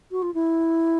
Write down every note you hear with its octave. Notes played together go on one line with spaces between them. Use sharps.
F#4
F4
E4